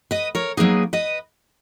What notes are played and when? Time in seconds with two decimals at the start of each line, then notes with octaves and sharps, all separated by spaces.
0.11 B4 D#5
0.35 A#4 C#5
0.57 F#3 A#3 D#4 G#4 B4
0.93 B4 D#5